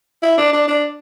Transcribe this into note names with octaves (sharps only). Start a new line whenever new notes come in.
E4
D4
D4
D4